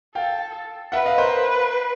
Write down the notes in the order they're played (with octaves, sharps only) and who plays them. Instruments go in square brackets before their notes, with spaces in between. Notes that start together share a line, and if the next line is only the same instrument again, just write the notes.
[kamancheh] A4 [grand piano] F5 G5
[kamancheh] B4 [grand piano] E5 F#5
[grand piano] D#5 F5
A#4 C5